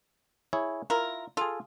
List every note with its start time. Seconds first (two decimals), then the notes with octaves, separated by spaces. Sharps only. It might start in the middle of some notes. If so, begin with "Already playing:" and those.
0.53 E4 G#4 C#5
0.90 E4 F4 A#4
1.37 F4 G#4 A4